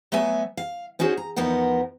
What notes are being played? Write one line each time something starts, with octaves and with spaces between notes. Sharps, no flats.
F#3 A3 B3 E5 G#5
F5
B3 C#4 D#4 F#4 G#4 C5
A#5
E2 F3 B3 D#4 A#4 F#5